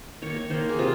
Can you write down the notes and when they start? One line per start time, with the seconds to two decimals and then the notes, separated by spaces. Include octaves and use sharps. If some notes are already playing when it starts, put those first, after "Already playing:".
0.22 D#3 A#3 C#5
0.36 C#5
0.50 D#3 A#3 C5
0.60 A#4
0.69 G#4
0.79 C3 F4